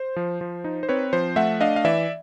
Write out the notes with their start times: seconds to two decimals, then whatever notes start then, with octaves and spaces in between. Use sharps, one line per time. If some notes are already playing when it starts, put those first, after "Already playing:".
Already playing: C5
0.16 F3
0.41 F3
0.64 D#4
0.83 C5
0.89 C4 B4 C#5
1.13 F3 C5
1.36 A3 E5 F#5
1.61 D4 D#5 F5
1.76 F5
1.85 E3 D5 E5